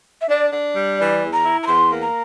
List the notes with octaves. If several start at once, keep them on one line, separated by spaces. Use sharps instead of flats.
E5
D4 D5
D4
G3
E3 D5
E2
A#5
E4
A#5
E2 C6
A#3
A#5